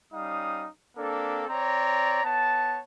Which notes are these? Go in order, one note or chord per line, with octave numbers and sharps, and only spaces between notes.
G3 C#4 D#4 F5 D#6
A#3 C4 D4 A4
C4 C#5 D5 A#5
B3 C#5 A5